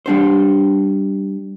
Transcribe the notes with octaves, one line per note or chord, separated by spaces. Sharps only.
G3 D4 C5